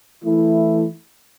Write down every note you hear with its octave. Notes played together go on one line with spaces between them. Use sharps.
E3 A3 E4